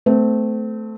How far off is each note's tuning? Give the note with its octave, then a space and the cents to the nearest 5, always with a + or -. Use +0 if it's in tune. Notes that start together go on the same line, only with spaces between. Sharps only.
A3 +0 C4 -30